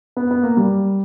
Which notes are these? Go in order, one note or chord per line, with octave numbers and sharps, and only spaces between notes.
B3
B3
A#3
G3